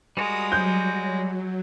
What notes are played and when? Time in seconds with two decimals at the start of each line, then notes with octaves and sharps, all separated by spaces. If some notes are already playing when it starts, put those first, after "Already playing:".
0.17 G3 G#3 F#4 A#4 D#6
0.52 F#3 G6